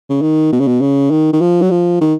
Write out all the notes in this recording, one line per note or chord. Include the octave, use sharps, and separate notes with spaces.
C#3
D#3
B2
C#3
B2
C#3
D#3
D#3
F3
F#3
F3
D#3